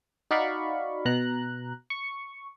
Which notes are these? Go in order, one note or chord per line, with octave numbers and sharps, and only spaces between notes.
D#4 F#4 D5 F5 B5 C#6
B2 A#5 F#6
C#6